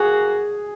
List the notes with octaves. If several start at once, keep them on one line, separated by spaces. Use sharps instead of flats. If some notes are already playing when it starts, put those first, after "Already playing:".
Already playing: F#3 A#3 F#4 G#4